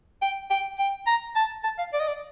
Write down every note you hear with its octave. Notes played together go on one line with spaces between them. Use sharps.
G5
G5
G5
A#5
A5
A5
F5
D5
D#5
D5